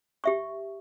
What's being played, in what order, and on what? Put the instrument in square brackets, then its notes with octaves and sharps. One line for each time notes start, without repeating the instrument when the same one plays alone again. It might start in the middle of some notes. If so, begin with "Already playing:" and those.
[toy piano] G4 E5 C#6